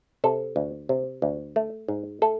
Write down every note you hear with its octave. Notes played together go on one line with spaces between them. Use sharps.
C3 A4
D2
C3
D2
A3
G#2
A3 A4